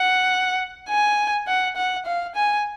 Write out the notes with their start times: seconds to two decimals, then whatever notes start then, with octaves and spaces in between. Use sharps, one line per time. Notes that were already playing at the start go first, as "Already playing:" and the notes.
Already playing: F#5
0.89 G#5
1.47 F#5
1.77 F#5
2.06 F5
2.36 G#5